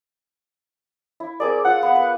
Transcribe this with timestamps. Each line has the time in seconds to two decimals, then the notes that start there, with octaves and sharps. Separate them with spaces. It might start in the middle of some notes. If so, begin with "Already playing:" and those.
1.20 E4
1.40 C4 G#4 A#4 D5
1.65 F4 D5 F#5
1.83 B3
1.95 B4